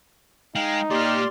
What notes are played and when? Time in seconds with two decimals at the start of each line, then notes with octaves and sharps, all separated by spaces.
0.55 G#3 D#4 F5 G5
0.90 A#2 A#3 G4 D5 C6 F6